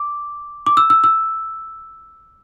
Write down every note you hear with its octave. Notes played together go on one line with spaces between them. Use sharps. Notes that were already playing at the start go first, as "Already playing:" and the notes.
Already playing: D6
D6
E6
E6
E6